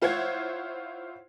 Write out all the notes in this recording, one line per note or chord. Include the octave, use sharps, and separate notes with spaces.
E4 F4 C5 C#5 F#5 G#6